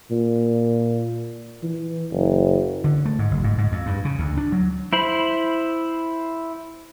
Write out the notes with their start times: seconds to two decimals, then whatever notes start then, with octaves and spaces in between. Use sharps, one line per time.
0.11 A#2
1.63 E3
2.12 F#1
2.84 D3
3.05 A3
3.19 G#2
3.31 F#1
3.44 G#2
3.58 G#2
3.72 F2
3.86 G2
4.05 C#3
4.19 D2
4.37 D4
4.52 F#3
4.93 E4 C5 B5